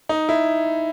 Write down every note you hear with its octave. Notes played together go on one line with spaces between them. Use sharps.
D#4
E4